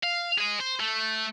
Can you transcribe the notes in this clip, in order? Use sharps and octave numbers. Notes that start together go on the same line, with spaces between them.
F5
G#4 D#5
C5
A3